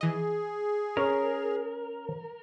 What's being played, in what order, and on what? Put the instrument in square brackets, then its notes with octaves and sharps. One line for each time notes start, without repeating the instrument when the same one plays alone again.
[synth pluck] E3 D#5 [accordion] G#4
[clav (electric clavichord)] C#4 [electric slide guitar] A#4